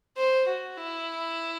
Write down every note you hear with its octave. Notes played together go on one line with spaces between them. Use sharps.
C5
F#4
E4